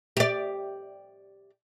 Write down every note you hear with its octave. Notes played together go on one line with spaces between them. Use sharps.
G4 D5